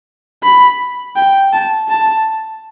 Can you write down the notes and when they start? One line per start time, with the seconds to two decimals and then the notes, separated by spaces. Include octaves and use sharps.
0.43 B5
1.16 G5
1.53 A5
1.89 A5